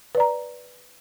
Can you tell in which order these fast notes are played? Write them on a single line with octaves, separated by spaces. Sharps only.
B4 D5 A#5